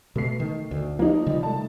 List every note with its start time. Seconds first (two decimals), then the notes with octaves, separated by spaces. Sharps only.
0.16 B2 A3 C7
0.40 D#3
0.71 D2
0.99 F3 A#3 D#4
1.26 C3 D#3 G3
1.43 A3 A5